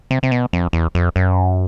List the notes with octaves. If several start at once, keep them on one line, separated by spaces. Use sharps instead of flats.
C3
C3
B2
F2
E2
F2
F#2